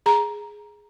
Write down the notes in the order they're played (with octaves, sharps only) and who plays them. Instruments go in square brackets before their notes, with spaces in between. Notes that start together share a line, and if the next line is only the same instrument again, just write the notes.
[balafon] G#4 A#5